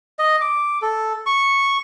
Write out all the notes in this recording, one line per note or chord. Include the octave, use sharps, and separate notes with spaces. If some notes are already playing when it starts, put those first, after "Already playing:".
D#5
D6
A4
C#6